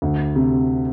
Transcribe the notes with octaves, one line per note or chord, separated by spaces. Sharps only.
D2
C3